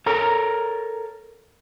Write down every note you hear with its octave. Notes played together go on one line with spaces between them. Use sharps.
A4 A#4 C#5 A#5